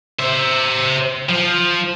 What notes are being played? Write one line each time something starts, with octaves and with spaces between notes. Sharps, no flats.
C5 E5
F3